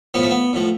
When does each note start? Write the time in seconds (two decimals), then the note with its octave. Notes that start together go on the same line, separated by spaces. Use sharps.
0.14 A2 F3 B3
0.23 A3
0.31 B3
0.53 A2 F3